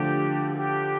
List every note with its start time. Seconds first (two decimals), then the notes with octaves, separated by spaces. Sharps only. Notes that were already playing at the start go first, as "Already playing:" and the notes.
Already playing: D3 F3 A3 G4
0.53 A4
0.57 G4